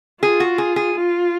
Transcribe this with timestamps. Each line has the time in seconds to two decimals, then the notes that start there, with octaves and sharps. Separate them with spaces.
0.22 F4 G#4
0.40 F#4
0.58 G#4
0.76 G#4
0.94 F4